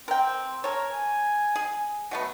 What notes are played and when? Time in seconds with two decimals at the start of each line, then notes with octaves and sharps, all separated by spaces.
0.08 C4 A#4 G5
0.64 A4 A#4 C#5
0.92 G#5
1.56 G#4
2.11 F#3 A3 B3